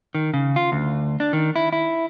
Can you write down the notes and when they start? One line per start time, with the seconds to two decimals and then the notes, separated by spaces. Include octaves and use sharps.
0.15 D#3
0.34 C#3
0.56 F4
0.72 D2
1.20 D4
1.33 D#3
1.56 E4
1.73 E4